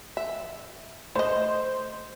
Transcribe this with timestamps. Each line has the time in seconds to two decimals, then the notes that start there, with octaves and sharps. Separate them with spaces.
0.17 E5
1.15 A3 C5 D#5